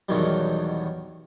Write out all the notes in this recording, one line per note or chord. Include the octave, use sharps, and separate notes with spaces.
E2 B2 D#3 F#3 G3